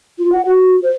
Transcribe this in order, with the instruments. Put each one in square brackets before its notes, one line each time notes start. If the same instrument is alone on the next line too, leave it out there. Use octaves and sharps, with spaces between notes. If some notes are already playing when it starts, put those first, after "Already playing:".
[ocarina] F4
F#5
F#4
C5